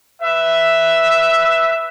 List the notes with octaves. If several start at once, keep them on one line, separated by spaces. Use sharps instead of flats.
B4 E5